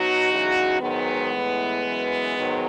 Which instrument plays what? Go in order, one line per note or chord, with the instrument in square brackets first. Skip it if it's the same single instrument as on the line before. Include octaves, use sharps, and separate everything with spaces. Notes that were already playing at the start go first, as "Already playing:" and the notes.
Already playing: [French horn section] B2 F#3 D#4 F#4
E2 C#3 F#3
G#2 D#3 F#3 G#3 B3
A2 E3
F#2 E3
G#2 D#3 F#3